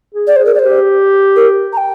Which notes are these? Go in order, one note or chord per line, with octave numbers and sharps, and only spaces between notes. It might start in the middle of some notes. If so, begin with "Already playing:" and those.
G#4
D5
G#4 C5
A#4
D5
G4 C5
A#4
A#5
G5